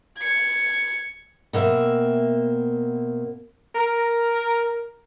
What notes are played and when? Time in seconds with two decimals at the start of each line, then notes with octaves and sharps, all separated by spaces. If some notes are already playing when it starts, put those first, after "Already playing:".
0.19 G#6 C#7
1.53 B2 A#3 C4 E5
3.75 A#4